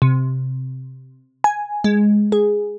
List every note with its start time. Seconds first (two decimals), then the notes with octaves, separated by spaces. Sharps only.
0.02 C3
1.44 G#5
1.84 G#3
2.32 G#4